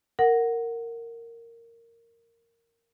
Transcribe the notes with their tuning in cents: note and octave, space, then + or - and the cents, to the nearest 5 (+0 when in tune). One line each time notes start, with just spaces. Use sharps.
A#4 -10 F#5 +0